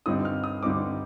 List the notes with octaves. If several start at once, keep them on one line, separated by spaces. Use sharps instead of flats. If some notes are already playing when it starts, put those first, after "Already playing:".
G2 D3 G3 C4 D#4 D#6
F6
D#6
G2 D3 G3 C4 D#4 D6